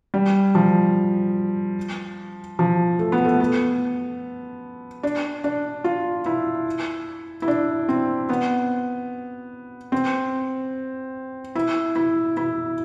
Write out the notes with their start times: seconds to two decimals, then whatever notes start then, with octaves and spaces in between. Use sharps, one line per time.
0.14 G3
0.55 F3
2.59 F3
2.99 A3
3.12 B3
3.24 A3
3.40 B3
5.03 D4
5.44 D4
5.84 F4
6.26 E4
7.42 E4
7.48 D4
7.88 C4
8.29 B3
9.92 C4
11.55 E4
11.96 E4
12.37 E4